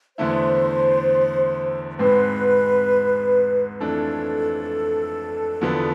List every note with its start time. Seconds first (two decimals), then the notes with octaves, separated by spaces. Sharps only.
0.17 E2 D3 A3 E4 C5
1.99 G#1 G#2 G#3 C4 B4
3.80 F2 E3 A3 D4 A4
5.61 E2 D3 F3 B3